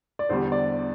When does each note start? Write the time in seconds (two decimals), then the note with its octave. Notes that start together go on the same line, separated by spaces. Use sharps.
0.19 D5
0.29 E2 D3 G3 C5
0.52 D5